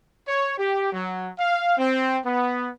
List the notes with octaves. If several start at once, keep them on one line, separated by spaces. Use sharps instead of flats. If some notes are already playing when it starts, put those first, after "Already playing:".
C#5
G4
F#3
F5
C4
B3